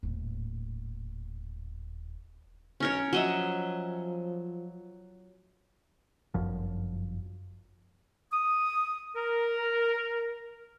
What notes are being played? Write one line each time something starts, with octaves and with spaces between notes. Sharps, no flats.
D#1 A2
B1 C#4 A#4 C#5
F3 F#3 D#5 E5
G1 F#2 F3
D#6
A#4